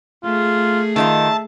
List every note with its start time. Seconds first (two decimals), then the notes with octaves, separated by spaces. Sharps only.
0.24 A3 F4 G#4
0.96 D#3 D#4 F4 E5 A5